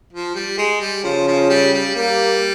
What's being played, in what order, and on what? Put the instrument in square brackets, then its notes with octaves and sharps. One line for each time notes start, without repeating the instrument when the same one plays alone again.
[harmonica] F3
G3
G#3
G3
[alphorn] C#3 [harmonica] F3
[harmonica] F3
G3
G3
[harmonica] G3 [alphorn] A#3